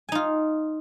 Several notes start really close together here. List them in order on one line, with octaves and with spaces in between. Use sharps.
G#5 D#4 F4